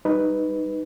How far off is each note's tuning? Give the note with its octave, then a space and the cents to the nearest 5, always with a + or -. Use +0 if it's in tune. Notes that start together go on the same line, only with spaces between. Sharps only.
G3 +0 D#4 -5 B4 +0